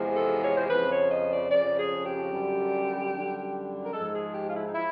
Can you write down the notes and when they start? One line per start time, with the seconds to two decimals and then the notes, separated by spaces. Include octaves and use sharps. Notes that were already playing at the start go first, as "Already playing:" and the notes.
Already playing: E2 C3 F3 G#3
0.16 A4
0.44 C#5
0.57 C5
0.69 F2 C#3 F3 B4
0.90 C#5
1.10 D#5
1.30 D5
1.50 F2 C#3 F3 D5
1.78 G#4
2.05 G4
2.31 F#2 D3 G3
3.12 F#2 D3 G3
3.85 A#4
3.93 G#2 F3 G#3 A4
4.14 G#4
4.34 G4
4.48 F4
4.55 E4
4.67 D#4
4.74 F3 E4